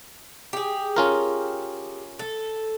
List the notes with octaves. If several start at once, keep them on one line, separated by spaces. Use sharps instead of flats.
G4 G#4
C#4 F4 A#4
A4